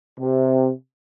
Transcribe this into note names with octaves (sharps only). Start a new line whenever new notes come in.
C3